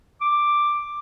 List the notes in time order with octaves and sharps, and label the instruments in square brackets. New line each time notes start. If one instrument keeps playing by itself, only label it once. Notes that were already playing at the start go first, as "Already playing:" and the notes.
[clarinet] D6